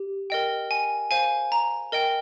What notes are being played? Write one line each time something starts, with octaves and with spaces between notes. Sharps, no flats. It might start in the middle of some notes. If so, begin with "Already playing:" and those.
Already playing: G4
A#4 D#5 G5
G#5
C5 F5 G#5
A#5
A#4 D#5 G5